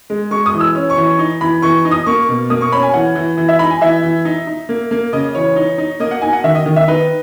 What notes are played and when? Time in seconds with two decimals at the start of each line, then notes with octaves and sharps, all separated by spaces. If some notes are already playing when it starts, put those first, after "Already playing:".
0.10 G#3
0.31 G#3 C#6
0.46 D#6
0.53 E3
0.61 E6
0.75 C#4
0.90 C#6
0.97 E3
1.04 C#6
1.19 D#4
1.41 E3 B5
1.62 E3 C#6
1.85 D#4
1.91 D#6
2.06 A#3 C#6
2.29 B2
2.50 A#3 D#6
2.61 C#6
2.72 C#4 B5
2.83 G#5
2.94 E3 F#5
3.15 E3
3.37 E3
3.49 E5
3.59 D#4 B5
3.70 G#5
3.81 E3 E5
4.03 E3
4.25 D#4
4.47 D#4
4.69 A#3
4.91 A#3
5.13 C#3 D#5
5.35 E3 C#5
5.56 D#4
5.78 D#4
6.00 A#3 D#5
6.11 F#5
6.22 D#4 G#5
6.33 F#5
6.44 D#3 E5
6.55 D#5
6.66 D#3
6.76 E5
6.88 D#4 B4